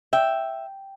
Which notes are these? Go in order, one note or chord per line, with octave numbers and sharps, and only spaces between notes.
E5 G5